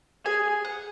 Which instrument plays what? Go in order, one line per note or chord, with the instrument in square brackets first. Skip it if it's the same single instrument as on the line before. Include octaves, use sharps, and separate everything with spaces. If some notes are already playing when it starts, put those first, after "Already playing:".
[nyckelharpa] G#4 [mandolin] G#5
[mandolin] F#5